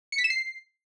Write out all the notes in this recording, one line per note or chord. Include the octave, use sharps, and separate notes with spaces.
C#7
B6
E7
C7